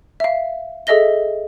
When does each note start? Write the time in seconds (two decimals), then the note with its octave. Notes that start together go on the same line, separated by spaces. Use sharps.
0.20 E5 F5
0.87 G#4 A4 D#5 E5 A#6 G7